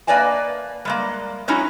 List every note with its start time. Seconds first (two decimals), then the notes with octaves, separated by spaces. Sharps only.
0.07 A#3 B4 D5 D#5 G#5 A5
0.85 G3 G#3 A#3
1.48 F#3 G#3 C#4 D#4 E4 F#4